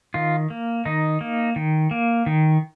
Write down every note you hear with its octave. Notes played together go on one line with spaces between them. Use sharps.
D#3 F4
A#3
D#3 D#4
A#3
D#3
A#3
D#3